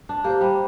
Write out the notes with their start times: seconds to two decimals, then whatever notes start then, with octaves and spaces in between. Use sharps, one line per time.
0.09 D4
0.24 A#3 G4 C5
0.41 G3